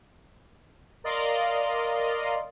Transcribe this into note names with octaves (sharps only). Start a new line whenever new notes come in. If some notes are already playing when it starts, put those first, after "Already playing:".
A#4 D5 D#5 F5 C6